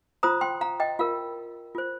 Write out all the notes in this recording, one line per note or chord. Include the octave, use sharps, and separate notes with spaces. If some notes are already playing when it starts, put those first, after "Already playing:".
F4 C5 A#5 D#6
G5 C6
F5 A#5
D#5 G5
F4 A#4 F5
F4 C5